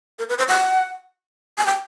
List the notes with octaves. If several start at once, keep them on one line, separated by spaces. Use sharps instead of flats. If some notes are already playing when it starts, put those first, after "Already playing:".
A#4
B4
C5
F#5
G#5
G5